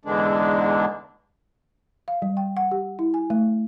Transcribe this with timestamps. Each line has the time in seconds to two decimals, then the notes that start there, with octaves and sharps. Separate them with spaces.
0.05 E2 G#2 D3 E3 G#3 D4
2.08 F5
2.22 G3
2.37 G5
2.57 F#5
2.71 G4
2.99 E4
3.14 G#5
3.30 A3